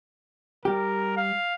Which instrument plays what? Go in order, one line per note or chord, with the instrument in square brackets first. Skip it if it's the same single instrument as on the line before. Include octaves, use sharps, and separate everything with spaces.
[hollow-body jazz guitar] G3 G4 [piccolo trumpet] A#4
[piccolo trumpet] F5